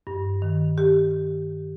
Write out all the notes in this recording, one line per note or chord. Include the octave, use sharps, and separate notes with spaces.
G2
D#3
G4